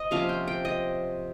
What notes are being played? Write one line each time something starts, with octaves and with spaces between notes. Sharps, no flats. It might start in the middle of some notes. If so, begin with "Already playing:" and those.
Already playing: D#5
C3 F3 A#3 C#4 F5
G5
G5
D#5